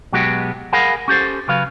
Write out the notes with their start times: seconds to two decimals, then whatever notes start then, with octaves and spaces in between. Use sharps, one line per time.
0.12 B2 F#3 G#3 B3 F#4 G4
0.73 G#4 A#4 F5 F#5 G#5 B5
1.08 C#4 G4 A4 C5
1.48 C#3 F#3 B4 F5